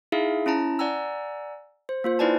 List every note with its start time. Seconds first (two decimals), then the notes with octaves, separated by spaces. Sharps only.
0.12 D#4 E4 G#4 E5 F5
0.46 C#4 E4 A5 A#5
0.79 D5 F#5 G#5 A#5 E6
1.89 C5
2.04 A#3 F4 C5
2.19 D#4 E4 B4 D5 G#5 A5